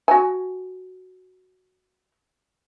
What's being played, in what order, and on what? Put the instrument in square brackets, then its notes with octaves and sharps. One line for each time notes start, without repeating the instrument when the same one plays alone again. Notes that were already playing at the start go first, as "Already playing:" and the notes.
[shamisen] F#4 G#5